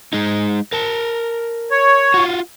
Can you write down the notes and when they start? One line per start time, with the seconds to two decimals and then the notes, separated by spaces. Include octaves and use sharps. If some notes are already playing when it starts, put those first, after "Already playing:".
0.13 G#3 D#4
0.73 A#4 A5
1.71 C#5
2.14 F4 F#4